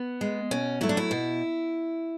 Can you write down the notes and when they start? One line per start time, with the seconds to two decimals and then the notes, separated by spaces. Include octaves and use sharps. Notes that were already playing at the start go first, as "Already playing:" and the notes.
Already playing: B3
0.21 G#3
0.51 B2 C#4
0.81 F#3 A3 E4
0.89 D4
0.97 E4
1.11 B2